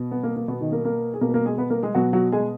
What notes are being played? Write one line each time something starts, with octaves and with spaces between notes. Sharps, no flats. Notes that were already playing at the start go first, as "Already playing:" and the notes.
Already playing: B2
B3
A#3
A#3
B2 B3
D#3 D#4
A#3 A#4
A#3 A#4
G#4
B2 A#3 A#4
B4
A#3 A#4
G#3 G#4
B3 B4
A#3 A#4
G#3 G#4
B2 F#3 F#4
F#3 F#4
G#3 G#4